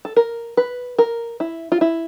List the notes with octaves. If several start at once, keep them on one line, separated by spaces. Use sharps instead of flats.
A4
A#4
B4
A#4
E4
F4
E4